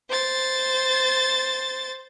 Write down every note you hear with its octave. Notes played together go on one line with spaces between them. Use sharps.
C5 A6